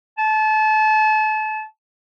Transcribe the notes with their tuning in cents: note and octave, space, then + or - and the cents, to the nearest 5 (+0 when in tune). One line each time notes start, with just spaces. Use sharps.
A5 -30